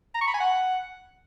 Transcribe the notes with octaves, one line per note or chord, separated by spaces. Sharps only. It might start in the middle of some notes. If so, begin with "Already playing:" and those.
A#5
C#6
B5
G#5
F#5